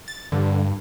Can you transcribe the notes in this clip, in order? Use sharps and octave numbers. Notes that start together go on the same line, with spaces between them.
A6
G2 D3